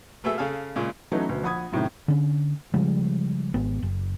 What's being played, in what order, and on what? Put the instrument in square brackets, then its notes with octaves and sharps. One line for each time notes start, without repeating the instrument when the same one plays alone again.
[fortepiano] B2 A3 B3 G#4 E5
C#3 G#4 A4 F5
A#2 C#3 G#3
[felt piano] E3 F#3 A3 B3 C#4 D#4
D2 B2
A#1 F#5 B5 D#6 G#6
F#2 A2 C3 D#3
[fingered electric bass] D3 C#4
C#3 F3 G3 G#3
G#1 B3
F#1